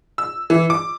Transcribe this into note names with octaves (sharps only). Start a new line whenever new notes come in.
E6
E3
D6